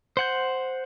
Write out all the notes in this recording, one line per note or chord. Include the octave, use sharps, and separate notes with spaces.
C5 F#5 G6